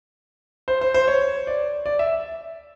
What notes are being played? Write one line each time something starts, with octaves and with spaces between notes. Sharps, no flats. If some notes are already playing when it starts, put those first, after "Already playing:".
C5
C5
C5
C#5
D5
D5
E5